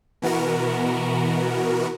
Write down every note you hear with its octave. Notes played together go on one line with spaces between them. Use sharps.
B2 E3 B3 F#4 A#4